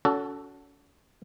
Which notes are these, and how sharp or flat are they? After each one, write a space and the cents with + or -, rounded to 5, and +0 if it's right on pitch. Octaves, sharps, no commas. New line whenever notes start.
C#4 +40 F#4 +0 A4 +0